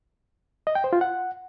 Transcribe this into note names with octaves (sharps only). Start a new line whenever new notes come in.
D#5
G5
C5
F4
F#5